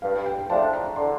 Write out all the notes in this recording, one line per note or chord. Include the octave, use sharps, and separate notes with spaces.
G2 F5
G5
F3 A3 D4 A5
A#5
D3 C6